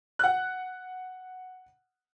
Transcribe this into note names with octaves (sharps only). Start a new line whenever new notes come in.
F#5 F#6